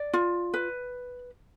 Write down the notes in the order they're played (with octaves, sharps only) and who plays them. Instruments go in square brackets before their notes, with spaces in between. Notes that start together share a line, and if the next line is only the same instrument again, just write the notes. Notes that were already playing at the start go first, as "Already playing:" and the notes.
Already playing: [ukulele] D5
F4
B4